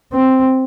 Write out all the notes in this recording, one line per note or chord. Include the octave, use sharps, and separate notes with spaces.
C4